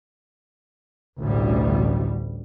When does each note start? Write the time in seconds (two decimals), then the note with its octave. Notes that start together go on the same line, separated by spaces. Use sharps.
1.20 A1 D2 B2 G3